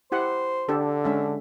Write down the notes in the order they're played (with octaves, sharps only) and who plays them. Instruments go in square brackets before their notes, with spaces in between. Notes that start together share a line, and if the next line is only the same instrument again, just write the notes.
[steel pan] E4 G4 F#5 [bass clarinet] C5
[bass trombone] D3 [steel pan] D4 G4 A4
[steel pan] G#3 C#4 E5 [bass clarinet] D4